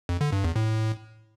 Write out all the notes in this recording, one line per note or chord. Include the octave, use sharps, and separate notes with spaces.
F2
D3
G2
E2
A2